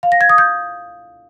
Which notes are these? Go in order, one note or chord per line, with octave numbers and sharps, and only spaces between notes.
F5
A#6
G#6
D#6
G6